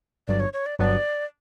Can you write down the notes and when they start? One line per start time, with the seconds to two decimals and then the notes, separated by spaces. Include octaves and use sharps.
0.28 G1 G2 F#3 D5
0.40 C#5
0.53 C#5
0.66 D5
0.79 G1 G2 F#3 B3 D4 D5